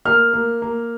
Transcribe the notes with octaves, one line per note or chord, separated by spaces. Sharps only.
A#3 F6
A#3
A#3